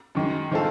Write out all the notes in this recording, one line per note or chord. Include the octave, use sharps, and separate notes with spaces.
F#2 D#3 G#3
D#3 G#3 C4 F4 A4